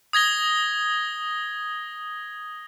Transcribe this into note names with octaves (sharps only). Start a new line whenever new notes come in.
D#6 G#6 A#6 G7